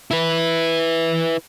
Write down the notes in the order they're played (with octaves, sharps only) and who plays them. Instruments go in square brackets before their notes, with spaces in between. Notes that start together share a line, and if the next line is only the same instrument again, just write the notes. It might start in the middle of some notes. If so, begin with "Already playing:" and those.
[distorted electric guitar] E4 B4